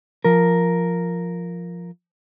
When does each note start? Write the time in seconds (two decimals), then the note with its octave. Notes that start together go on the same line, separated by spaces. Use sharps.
0.24 F3 A#4